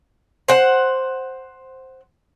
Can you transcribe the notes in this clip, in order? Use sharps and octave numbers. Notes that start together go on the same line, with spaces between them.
C5 F#5